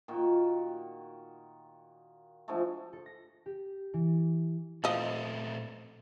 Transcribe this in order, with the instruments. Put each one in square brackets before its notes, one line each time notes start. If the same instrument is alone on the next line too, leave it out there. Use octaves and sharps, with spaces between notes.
[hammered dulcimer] A#2 D#3 F#4 G5
D3 F3 G#3 A3
[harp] A4
A#6
G4
E3
[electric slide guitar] A#2 A3 C4 [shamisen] F3 D#5